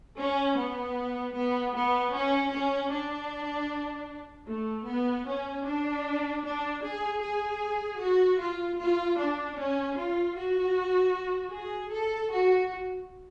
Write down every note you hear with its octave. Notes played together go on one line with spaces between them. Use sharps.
C#4
B3
B3
B3
C#4
C#4
D4
A3
B3
C#4
D4
D4
G#4
G#4
F#4
F4
F4
D4
C#4
F4
F#4
G#4
A4
F#4